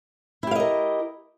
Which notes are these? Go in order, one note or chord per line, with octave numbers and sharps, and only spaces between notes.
E4 G4 A#4 D#5 F5